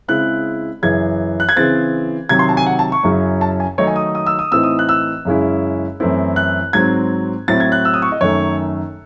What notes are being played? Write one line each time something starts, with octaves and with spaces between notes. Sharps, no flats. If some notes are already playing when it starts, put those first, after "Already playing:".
C#3 G#3 C4 E4 F#6
F#2 C#3 E3 G#6
F#6
G#6
C#3 E3 C4 A6
C3 D#3 F#3 G#6
C6
A5
G#5
F#5
A5
C#6
F#2 C#3 F#3 C#4 E4
A5
G#5
D#3 F#3 A3 D#4 C#5
G#5
D#6
D#6
E6
D#6
A2 E3 C4 D#4 E6
D#6
F#6
E6
F#2 C#3 G#3 C#4 E4
F#2 E3 A3 C4 E4
F#6
G#2 F#3 C4 G#6
A2 F#3 C4 E4 A6
G#6
F#6
E6
D#6
C#6
D#5
F#2 D#3 A3 C#4 C#5